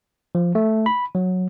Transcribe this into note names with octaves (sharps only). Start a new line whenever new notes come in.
F3
A3
B5
F#3